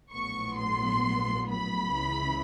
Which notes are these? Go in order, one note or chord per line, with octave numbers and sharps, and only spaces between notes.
A#1 A2 F#3 B3 C#6
C6
B5
C#2 C#3 E3